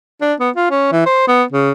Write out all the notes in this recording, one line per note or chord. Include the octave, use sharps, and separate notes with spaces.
D4
B3
F4
C#4
E3
C5
B3
C#3